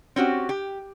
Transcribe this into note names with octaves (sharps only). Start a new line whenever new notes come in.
C4 C#4 F#4 G4
G4